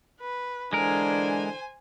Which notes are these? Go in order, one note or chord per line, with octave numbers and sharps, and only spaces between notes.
B4
D3 E3 G#3 D4 A#4 C5 G#5